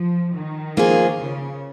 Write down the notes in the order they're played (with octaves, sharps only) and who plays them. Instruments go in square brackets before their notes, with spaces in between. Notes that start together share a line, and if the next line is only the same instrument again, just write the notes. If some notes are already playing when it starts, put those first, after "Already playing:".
Already playing: [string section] F3
D#3
[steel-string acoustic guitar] F3 A#3 F4 G#4
[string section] C#3